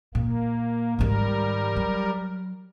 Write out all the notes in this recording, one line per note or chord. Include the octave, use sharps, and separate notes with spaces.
A#2 A#3
G#2 D#3 G3 A#4
F#3